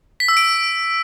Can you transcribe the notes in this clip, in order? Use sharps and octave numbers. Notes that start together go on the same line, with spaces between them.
B6
E6
D7